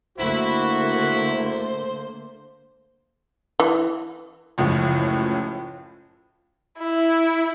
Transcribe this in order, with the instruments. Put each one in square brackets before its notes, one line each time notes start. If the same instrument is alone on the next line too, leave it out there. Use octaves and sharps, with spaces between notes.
[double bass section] D3 A3 A#3 [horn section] E4 [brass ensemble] F#4 [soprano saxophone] C5
[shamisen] E3
[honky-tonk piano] F#1 C#2 F#2 A2 F3
[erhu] E4